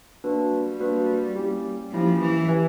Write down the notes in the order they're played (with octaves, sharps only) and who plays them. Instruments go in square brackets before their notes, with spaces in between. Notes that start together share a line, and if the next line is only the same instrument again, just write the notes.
[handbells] A#3 D4 F#4 B4
[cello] G3
[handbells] A#3 D4 F#4 B4
A#3 C#4 E4 G4
[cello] F3 [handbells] A#3 C#4 E4 G4
[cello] E3
[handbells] G4 B4 E5 G#5